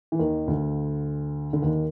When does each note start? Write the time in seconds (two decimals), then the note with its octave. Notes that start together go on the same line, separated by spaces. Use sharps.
0.12 E3
0.19 D#2 D#3
0.47 D2 D3
1.53 D3
1.62 D#2 D#3